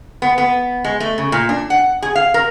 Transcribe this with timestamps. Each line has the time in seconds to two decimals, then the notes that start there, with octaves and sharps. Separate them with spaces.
0.22 B3
0.38 B3
0.84 G#3
1.00 A3
1.18 C#3
1.32 A#2
1.49 D4
1.70 F#5
2.02 G#4
2.16 F5
2.34 A#4